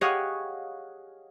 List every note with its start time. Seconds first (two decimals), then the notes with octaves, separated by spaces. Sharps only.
0.01 G4 G#4 C#5 D#5 F5 F#5